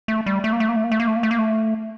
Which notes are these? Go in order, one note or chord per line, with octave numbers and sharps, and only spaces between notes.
A3
G3
A3
A#3
A3
A#3
A3
A#3
A3
A#3
A3
A#3
A3
A#3
A3